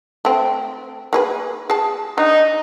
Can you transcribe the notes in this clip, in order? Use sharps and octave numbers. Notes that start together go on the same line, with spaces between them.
A3 C4
A#3 G#4 B4
G#4 A5
D4 D#4